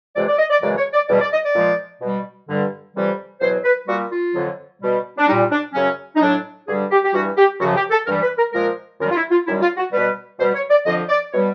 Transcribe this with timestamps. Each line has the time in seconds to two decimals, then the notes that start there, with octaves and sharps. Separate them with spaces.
0.15 F2 C3 E3 G#3 D5
0.27 D5
0.38 D#5
0.50 D5
0.61 F#2 C#3 E3 G#3 D5
0.77 C#5
0.93 D5
1.08 E2 B2 G3 D5
1.20 D5
1.32 D#5
1.43 D5
1.54 A#2 F3 G#3
2.01 B2 G3
2.48 G2 D3 G3
2.94 F2 C3 E3 G3
3.41 E2 B2 F#3 C5
3.64 B4
3.87 A#2 G3 F#4
4.11 F4
4.34 F2 D3 F#3
4.81 B2 G3
5.18 D4
5.27 A#2 G3 D#4
5.51 D4
5.73 F#2 C#3 F#3 C#4
6.16 D#4
6.20 A2 F#3 D4
6.67 G2 D3 G3 G#4
6.90 G4
7.03 G4
7.13 G2 E3 G3 F#4
7.37 G4
7.60 F#2 C#3 F3 F#4
7.75 G4
7.91 A4
8.06 G2 E3 G3 A#4
8.22 B4
8.37 A#4
8.53 A#2 F3 G#3 A#4
9.00 F#2 D#3 G3 A#4
9.11 F4
9.16 E4
9.31 F4
9.46 F#2 D#3 G3 E4
9.62 F4
9.77 F#4
9.92 B2 G3 B4
10.39 B2 G3 C5
10.55 C#5
10.70 D5
10.85 F2 D3 F3 D#5
11.09 D5
11.32 B2 G3 C#5